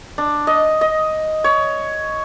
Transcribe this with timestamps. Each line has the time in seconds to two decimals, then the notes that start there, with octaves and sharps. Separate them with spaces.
0.18 D4
0.47 D#5
0.81 D#5
1.44 C#5